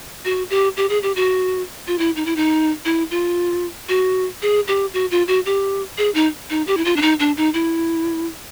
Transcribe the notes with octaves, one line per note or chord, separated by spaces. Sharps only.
F#4
G4
G4
G#4
G4
F#4
F4
E4
D#4
E4
D#4
E4
F4
F#4
G#4
G4
F#4
F4
F#4
G4
G#4
D#4
D#4
G4
E4
F4
D4
D#4
D4
D#4
E4